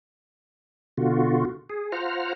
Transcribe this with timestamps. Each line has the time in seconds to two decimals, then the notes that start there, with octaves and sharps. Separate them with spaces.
0.97 B2 D3 F4 F#4
1.70 G#4
1.92 F4 C5 F#5 A#5 F6